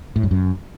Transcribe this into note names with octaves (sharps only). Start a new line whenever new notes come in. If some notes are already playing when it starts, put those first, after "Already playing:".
A2
G2
F#2